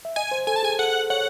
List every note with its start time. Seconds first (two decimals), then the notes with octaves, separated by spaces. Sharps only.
0.05 E5
0.16 D#5 G#5
0.31 C5
0.47 A4 G#5
0.56 A5
0.63 G#4 G#5
0.79 A4 F#5
1.10 C#5 F#5